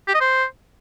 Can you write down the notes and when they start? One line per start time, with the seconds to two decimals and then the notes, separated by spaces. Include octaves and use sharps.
0.08 G4
0.14 D#5
0.21 C5